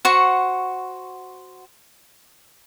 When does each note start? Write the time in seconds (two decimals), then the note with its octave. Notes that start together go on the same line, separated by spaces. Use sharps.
0.05 F#4 C5 F#5 C#6